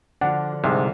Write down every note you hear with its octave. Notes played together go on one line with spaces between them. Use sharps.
D3 F3 D4 F4 F#5
C2 G#2 C3